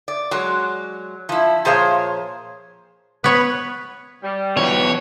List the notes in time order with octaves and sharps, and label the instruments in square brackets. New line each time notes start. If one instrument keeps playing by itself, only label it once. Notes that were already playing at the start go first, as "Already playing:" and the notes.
[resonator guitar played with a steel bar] D5
F#3 G#3
F3 E4
A#2 F3 G#4 C5 C#5 F5
[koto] B3 C#5 [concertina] B4 B5
[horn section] G3
[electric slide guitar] B2 E3 F#3 [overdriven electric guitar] C#5